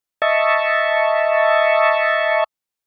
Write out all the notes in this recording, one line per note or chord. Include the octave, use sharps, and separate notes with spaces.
D#5 E5 A5 C#6